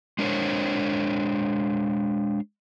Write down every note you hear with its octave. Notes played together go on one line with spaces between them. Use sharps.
G#3 D4 A#4 C5 C#5